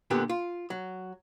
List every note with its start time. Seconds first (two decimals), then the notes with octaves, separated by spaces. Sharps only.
0.10 A#2 D3 B3 G4
0.29 F4
0.70 F#3